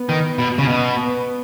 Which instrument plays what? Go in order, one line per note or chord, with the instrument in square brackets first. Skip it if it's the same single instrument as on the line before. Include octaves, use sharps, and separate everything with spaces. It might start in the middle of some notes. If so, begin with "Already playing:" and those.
Already playing: [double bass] B3
[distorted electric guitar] D#3
B2
C#3
B2
[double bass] B3